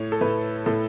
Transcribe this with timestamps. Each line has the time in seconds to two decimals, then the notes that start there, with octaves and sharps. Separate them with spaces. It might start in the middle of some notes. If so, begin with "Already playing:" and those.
Already playing: A2 C#5
0.12 A4
0.21 A2 B4
0.66 A2 A4